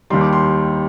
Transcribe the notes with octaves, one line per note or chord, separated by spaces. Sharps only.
D#2 D#3 G3 C6
D6
C6